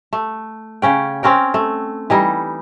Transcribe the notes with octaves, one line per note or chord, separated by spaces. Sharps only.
A3
C#3 C#4 G5
C4 C#4 A#4 G5
A3
E3 G3 D#4